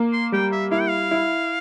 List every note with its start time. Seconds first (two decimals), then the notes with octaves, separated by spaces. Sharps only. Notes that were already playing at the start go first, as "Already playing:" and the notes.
Already playing: A#3
0.13 C6
0.32 G3 G5
0.52 E5
0.71 E4 F5
0.80 G5
0.89 F5
1.11 E4